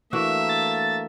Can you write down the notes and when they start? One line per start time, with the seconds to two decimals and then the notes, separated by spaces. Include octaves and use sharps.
0.13 E3 A3 A#3 D4 F#4 E5
0.49 A6